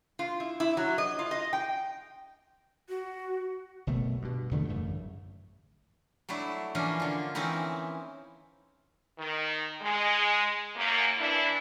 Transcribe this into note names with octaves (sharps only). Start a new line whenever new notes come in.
F4
E4
E4
F#3
D#5
F4
D#5
G5
F#4
F#1 B2 A3
G2 B2
E2 D3 F3 A3
A1 F#2 C#3 A3
F#3 A3 D4 E4
E3 F3 A#3 C#4 D4
D3 F4
E3 C4 C#4 D#4 E4
D#3
G#3
F#2 A#3
E3 D4 E4